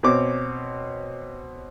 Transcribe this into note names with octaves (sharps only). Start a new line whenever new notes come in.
B2 C4 C#5 D6